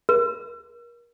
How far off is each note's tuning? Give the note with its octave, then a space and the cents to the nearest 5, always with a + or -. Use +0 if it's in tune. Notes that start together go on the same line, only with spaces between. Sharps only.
A#4 +30